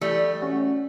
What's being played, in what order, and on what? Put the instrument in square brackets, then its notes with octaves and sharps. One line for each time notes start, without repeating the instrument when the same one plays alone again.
[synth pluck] E3 [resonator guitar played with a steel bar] G3 A3
[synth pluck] A3 C#4 F#4